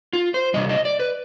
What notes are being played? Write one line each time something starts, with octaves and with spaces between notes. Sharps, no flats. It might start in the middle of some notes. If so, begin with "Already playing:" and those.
F4
C5
C3 G3 D#5
D#5
D5
B4